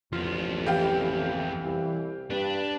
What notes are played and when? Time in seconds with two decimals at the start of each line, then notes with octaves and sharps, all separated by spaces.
0.13 A1 F2 B3 F4
0.66 E3 G4 F5 G5
1.64 C2
2.30 G2 D4 B4